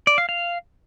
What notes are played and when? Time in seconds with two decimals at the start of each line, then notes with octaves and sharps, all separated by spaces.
0.07 D5
0.18 F5
0.29 F5